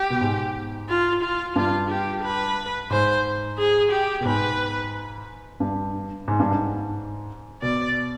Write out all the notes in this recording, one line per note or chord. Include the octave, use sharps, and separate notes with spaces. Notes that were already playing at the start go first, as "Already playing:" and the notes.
Already playing: G4
B2
G#2
F4
F4
G2 F4
G4
B4
G#2 C5
G#4
G4
B2
G#2 B4
G2
G#2
G2
G#2
B2 D5